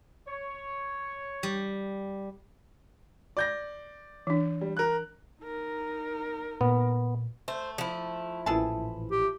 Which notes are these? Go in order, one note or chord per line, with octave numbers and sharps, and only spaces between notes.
C#5
G3
D5 G6 A#6
E3 D4
G3
A#4 F#6
D#4 A#4
A#2 B3
A3 C5
F3 E4
A1 A#2 E3 G#4 A4 A5
G4